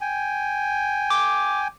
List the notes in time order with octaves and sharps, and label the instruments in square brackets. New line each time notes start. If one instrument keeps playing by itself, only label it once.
[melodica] G5 G#5
[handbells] D6